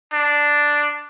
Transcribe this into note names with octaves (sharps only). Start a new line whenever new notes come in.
D4